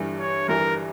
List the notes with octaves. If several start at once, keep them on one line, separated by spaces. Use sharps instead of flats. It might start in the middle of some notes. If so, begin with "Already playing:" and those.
Already playing: G1 G2 E3 G3
C#5
G1 G2 E3 G3 A#4